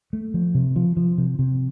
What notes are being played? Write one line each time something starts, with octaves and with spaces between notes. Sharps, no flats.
A3
F3
C3
F3
F3
C3
C3